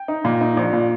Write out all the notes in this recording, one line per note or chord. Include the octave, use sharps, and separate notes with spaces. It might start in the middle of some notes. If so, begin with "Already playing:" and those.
Already playing: G5
D#4
A#2
D#4
A#1
A#2